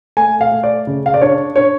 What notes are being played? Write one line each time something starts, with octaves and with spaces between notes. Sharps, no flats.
A3 G#5
F5
A3
D5
C#3
F5
D5
D4 C#5
D4 C#5